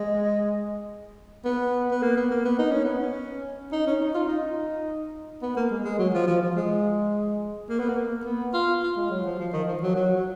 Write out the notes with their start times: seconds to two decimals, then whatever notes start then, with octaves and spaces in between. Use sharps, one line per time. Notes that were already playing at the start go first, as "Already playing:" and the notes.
Already playing: G#3
1.45 B3
1.91 B3
2.02 A#3
2.17 B3
2.30 A#3
2.45 B3
2.59 D#4
2.71 C#4
2.84 B3
2.98 C#4
3.72 D#4
3.87 C#4
4.01 D#4
4.14 F4
4.28 D#4
5.42 B3
5.56 A#3
5.71 G#3
5.84 G#3
5.98 F#3
6.14 F3
6.27 F3
6.41 F3
6.56 G#3
7.69 A#3
7.79 B3
7.89 A#3
8.25 B3
8.53 F4
8.83 F4
8.96 G#3
9.10 F#3
9.25 F3
9.39 F3
9.52 D#3
9.67 F3
9.82 F#3
9.96 F#3
10.17 F#3